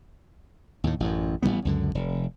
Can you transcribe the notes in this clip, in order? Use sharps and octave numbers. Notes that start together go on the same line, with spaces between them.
D#2 A2
A1 F#2
A1 C3 G3 B3
C#2 F#2 D3
F1